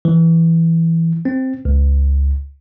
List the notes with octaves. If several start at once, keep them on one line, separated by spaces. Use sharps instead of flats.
E3
C4
C#2